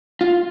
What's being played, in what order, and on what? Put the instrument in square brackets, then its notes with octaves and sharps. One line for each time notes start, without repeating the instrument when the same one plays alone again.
[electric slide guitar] F4